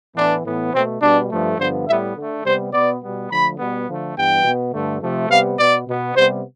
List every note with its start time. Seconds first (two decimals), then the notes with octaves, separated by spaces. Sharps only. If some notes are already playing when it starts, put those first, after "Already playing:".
0.16 A2 E3 B3 D4
0.44 A2 E3 B3
0.73 B2 A3 C4
1.01 B2 G3 B3 D4
1.30 G2 F3 A3
1.58 G2 D3 F3 B3 C5
1.87 A2 G3 B3 E5
2.16 D3 A3
2.44 C3 G3 B3 C5
2.72 B2 B3 D5
3.01 B2 G3 B3
3.29 D3 F3 A3 B5
3.58 B2 G3 B3
3.87 D3 F3 A3
4.16 G2 E3 G3 B3 G5
4.43 B2 B3
4.72 G2 D3 A3
5.01 C3 F3 A3
5.29 C3 G3 B3 F5
5.58 B2 B3 D5
5.86 B2 B3
6.15 C3 G3 B3 C5